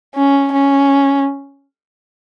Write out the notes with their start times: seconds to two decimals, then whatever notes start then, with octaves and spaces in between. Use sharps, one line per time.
0.15 C#4
0.52 C#4